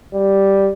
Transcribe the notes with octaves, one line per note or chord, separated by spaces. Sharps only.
G3